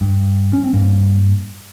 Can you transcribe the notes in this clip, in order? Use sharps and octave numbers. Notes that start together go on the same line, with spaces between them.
G2
C#4
C4
G2 G3 A#3